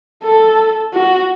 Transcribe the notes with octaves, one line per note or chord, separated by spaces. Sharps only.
A4
F#4